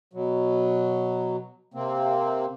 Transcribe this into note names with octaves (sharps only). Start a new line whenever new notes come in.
B2 F#3
C3 A#3 C4